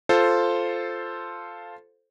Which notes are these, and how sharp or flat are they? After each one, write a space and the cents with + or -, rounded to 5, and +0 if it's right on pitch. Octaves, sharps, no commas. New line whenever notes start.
F4 +0 A4 +0 C5 +0